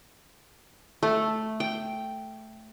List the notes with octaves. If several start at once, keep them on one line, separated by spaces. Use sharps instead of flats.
A3
G5